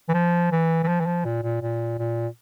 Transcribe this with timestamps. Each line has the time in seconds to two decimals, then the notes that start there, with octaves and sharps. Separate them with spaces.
0.09 E3
0.14 F3
0.51 E3
0.83 E3
0.88 F3
1.00 E3
1.06 F3
1.25 A#2
1.43 A#2
1.62 A#2
1.99 A#2